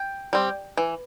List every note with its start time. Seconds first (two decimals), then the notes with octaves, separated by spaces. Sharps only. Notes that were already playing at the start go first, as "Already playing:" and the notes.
Already playing: G5
0.33 G3 C4
0.78 E3